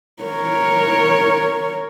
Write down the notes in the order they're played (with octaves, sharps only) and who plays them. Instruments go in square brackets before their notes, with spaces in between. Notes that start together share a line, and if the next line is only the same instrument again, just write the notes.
[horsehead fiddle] A#4 C#5